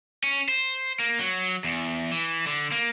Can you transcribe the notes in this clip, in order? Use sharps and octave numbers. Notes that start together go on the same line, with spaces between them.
C#4
C5
A#3
F#3
E2
E3
D3
A#3